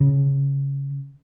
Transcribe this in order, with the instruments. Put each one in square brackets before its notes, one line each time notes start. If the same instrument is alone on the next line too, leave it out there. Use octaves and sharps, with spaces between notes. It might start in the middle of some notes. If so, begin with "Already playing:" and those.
[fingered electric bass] C#3